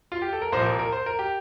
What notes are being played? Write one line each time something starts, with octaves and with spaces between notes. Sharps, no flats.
F4
G4
A4
A#4
C2 A#2 F3 C5
A#4
A#4
C5
A#4
G4